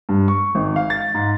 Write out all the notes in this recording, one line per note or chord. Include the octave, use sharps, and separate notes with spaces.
G2
C#6
G#1
F5
A6
G#2